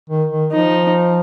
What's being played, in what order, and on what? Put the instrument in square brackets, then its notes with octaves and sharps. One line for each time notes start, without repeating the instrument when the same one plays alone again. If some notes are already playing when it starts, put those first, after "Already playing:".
[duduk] D#3
D#3
[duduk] F3 [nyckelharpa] D#4